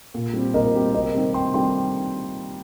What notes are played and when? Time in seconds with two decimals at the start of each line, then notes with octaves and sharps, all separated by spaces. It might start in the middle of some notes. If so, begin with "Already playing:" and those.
0.14 A#2
0.33 G3 C4 G4
0.54 A#2 A#4 D#5
0.74 G3 C4 G4
0.94 C3 A#4 D#5
1.14 D#3 G3 C4 G4
1.34 C3 G5 C6
1.54 D#3 G3 C4 G4 G5 C6